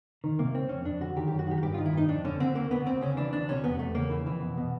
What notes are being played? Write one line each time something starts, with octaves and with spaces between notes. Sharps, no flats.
D#3
C3 A#3
C#2 C4
F2 C#4
F2 D4
D3 F#4
D#3 G4
F#2 G4
F#4
D#3 G4
F#4
G2 G4
D#3 F4
E4
G2 D#4
F2 D4
D3 C#4
D3 C4
D2 A#3
D2 B3
D2 C4
C#3 C#4
E3 D4
D2 D4
C3 C#4
E2 B3
E2 A3
C#3 A#3
E3
F2 E3
B2
B2